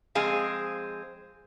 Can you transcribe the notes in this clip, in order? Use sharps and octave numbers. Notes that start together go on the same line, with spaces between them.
F3 G#3 C4 G#4 F5